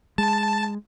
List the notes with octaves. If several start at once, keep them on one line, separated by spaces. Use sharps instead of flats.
G#3 A5